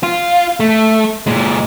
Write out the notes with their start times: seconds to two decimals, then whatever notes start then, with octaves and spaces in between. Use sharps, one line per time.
0.03 F4
0.60 A3
1.27 A#2 G#3